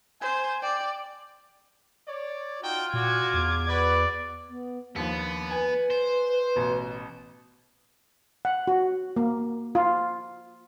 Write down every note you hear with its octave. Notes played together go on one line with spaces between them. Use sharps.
C5 G#5
D5 G5
C#5 D5
D#4 F4 F#4 G5
A#2 F#4 D6 G#6
E2
F#4 B4 D5
B3
D#2 F3 B3 D4
B4 G#5
C5
A1 B2
F#5
F#4
A#3
F4